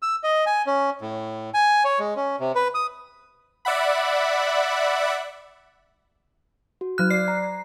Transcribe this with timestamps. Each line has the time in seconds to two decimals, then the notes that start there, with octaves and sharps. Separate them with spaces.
0.02 E6
0.24 D#5
0.46 G#5
0.66 C#4
1.01 A2
1.54 G#5
1.85 C#5
1.99 G#3
2.16 C#4
2.40 C3
2.55 B4
2.74 D#6
3.65 D5 E5 F#5 B5
6.81 F#4
6.98 F#3 F6 F#6
7.11 D5 C7
7.28 A#5